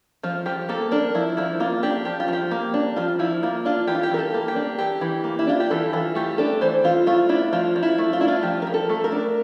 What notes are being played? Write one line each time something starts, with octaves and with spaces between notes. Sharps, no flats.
F3 F4
F3 G4
A#3 A4
D4 A#4
F3 E4
F3 E4
A#3 F4
D4 G4
F3 G4
F4
F3
G4
A#3
D4
F3 F4
F3 E4
A#3 F4
D4 F4
E3 G4
F4
G4
E3 A#4
A4
A#3
G4
D4
E3 G4
E3
A#3
E4
D4 F4
G4
E3 A4
E3 F4
A3 G4
D4 A4
E3 C5
E3 F4
A3 F4
D4 E4
F3 F4
F3
E4
A3
F4
D4 E4
F4
F3 G4
F3 A#4
A4
A3
A#4
D4